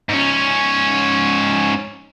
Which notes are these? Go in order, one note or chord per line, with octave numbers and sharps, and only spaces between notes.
G#2 C#4